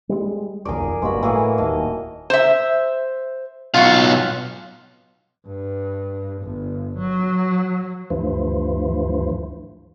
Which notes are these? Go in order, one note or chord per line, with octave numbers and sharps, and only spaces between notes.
G3 G#3
D#1 B1 F2 G#4 A#4 D5
F#1 G2 G#3 A#3 F#4 B5
A2 E3 A#3 G#4
D#1 D#2 D#5 A5
C5 E5
B1 F4 F#4 F5
G2
G1
F#3
D2 G2 E3 F3